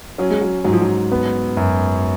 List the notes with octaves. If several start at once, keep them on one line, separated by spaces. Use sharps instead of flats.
F#3 C#4
G#3
F#3
G#2 F#3
F3
F#3
B3
F#2